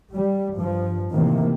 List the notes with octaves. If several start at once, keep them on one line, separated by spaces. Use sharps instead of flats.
G3
G2 F3
A2 C3 D#3 E3 A#3